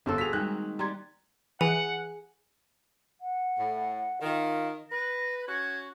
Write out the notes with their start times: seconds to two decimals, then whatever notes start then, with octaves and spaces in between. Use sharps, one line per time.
0.06 G1 A#3 C4 A4
0.18 F#4 G#4 B6 F7
0.33 D#3 G3 G#3 F#6
0.79 G3 A#5 C6 G#6
1.61 E3 G#4 F#5 G#5
3.20 F#5
3.58 A2
4.22 D#3 F4
4.90 B4 A#6
5.47 C#4 F#4 G#6